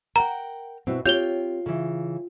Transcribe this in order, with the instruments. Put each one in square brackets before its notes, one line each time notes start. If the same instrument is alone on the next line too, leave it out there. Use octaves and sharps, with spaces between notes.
[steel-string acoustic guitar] A#4 F#5 G5 [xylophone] A#5
[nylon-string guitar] B2 E4 F#4 [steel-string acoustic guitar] C4
[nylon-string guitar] C4 G4 C#5 [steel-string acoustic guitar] F4 G5 [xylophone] G6 F7 G7
[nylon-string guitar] C#3 E3